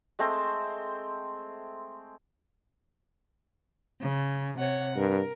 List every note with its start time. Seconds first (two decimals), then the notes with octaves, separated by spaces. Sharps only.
0.19 G#3 A3 C4 C6
4.00 C#3
4.57 C3 C#5 F#5
4.96 G2 A#4